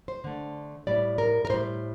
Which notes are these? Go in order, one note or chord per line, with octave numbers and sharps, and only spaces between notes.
C5
D3 A3
A2 G3 D5
A#4
A#4
A2 G3 C5